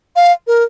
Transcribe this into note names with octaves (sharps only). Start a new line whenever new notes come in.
F5
A#4